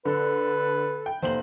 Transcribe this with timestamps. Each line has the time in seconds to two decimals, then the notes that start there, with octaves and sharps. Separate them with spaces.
0.05 D3 A4 B4
1.06 G5
1.22 F1 A#3 C5 F#7